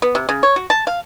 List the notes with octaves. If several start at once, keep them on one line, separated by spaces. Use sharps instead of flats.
B3
C3
C#3
C#5
F#4
A5
F5